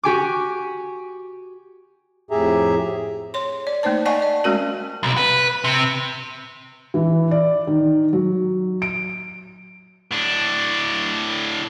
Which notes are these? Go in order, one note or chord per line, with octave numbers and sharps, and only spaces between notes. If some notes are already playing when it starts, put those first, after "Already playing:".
F#4 G4 G#5 D6
F2 A2 G4 G#4 E5 A#5
C#5 C6
D5
A3 A#3 D#4 C5 A5
D5 D#5 F#5 G#5 A5 C#6
D5
G#3 A3 C#4 F#4 A#4
B1
B4
C3
E3
D5
D#3
F#3
D7
A2 D4